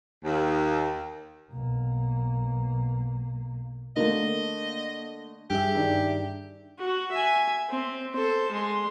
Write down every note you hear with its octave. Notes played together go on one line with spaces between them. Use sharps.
D#2
B1 A#3
D3 A3 A#3 D#5
G2 G4 G#4 E5
D#3 D4
F#4
E5 G#5
C4
A4 C5
G#3 C6